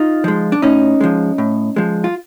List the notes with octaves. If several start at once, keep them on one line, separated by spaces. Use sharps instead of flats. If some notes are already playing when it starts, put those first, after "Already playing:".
Already playing: D#4 F4
F3 G#3
D4
A2 C#4 D#4
F3 G#3
A2
F3 G#3
F4